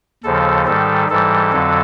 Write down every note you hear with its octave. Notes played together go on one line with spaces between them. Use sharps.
D#2 C#3 F3 A4
G#2 D#3 G3 A4
G#2 E3 G3 A4
F2 D3 F#3